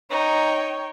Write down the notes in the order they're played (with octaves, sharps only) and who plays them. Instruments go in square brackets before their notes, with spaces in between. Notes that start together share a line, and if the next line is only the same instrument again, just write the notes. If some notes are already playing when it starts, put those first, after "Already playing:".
[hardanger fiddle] D#4 [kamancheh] C#5 G5